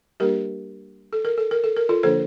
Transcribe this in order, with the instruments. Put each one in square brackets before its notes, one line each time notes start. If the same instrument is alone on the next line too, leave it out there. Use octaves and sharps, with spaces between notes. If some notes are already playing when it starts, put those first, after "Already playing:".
[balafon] G3 A#3 D4 G4 A#4
A4
A#4
A4
A#4
A4
A#4
F4 A4
D3 F3 A#3 D4 A4 C5